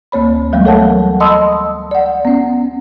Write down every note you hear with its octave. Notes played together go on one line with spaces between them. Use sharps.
D2 A#3 C#5 B5
E3 F#3 G3 A3 B3
A4 A#4 C#5 F#5 A5
D#5 A5 B5 C6 D#6 E6
D5 F#5
B3 C#4